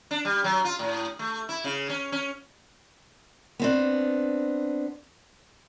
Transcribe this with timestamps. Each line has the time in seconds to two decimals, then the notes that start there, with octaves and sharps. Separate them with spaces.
0.11 D4
0.25 G3
0.44 F#3
0.65 F4
0.79 A2
1.19 A3
1.49 E4
1.64 C#3
1.89 C#4
2.12 C#4
3.59 B3 C4 D4